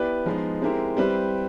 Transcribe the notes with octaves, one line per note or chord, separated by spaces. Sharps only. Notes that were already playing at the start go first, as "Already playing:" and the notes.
Already playing: B3 E4 G4 B4 D5
F3 G#3 B3 D#4
G#3 C4 E4 G4 A#4
G3 C4 E4 G4 B4